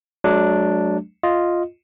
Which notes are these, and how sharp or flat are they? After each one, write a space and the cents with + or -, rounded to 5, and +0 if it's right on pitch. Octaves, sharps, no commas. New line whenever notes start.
F#3 +0 A3 -45 D4 +0
F4 +0 D#5 +0